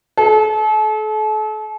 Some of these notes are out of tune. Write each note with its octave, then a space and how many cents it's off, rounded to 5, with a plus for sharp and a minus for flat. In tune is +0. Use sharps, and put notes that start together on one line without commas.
A4 -40